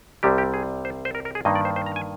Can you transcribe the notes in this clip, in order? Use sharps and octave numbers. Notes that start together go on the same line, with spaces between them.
C2 C3 G3 G4
G4
G#4
C5
C5
A#4
A#4
G#4
G2 D#3 A#3 D#5
D5
C5
C5
A#5
G#5